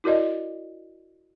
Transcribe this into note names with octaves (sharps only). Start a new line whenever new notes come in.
E4 F#4 A#4 D5 D#5